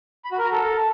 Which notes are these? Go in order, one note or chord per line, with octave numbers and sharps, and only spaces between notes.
B5
F#4
A#4
A#5
A4